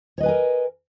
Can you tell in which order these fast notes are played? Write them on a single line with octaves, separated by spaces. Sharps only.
C#5 D#5 B4 G#5 A#4